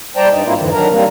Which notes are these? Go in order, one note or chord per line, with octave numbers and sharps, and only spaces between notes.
G3 C5 D5 G5 A5 A#5
G2 D#4
G#2 F#3 A#3 C4 E4 F4
F2 G#2 D3 E3
D#3 F#3 D4 A#4 A#5
D#3 G3 A#3 C4